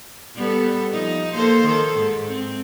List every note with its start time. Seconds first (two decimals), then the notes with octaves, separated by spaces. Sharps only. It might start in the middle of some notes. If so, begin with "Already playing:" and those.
0.35 G3 B3 A4
0.91 F3 D#4
1.34 A#3 A4 C5
1.65 D#3 A4
1.98 G#2
2.29 C4